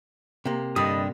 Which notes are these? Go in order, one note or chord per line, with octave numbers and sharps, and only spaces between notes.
C3 A#3
G2 D3 G3 D#5 B5 D#6